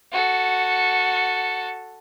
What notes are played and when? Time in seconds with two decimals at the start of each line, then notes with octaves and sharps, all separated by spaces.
0.12 F#4 A4